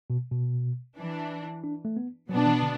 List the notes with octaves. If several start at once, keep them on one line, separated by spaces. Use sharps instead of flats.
B2
B2
E3 D4
D4
A3
B3
B2 F#3 B3 D4
E3
D3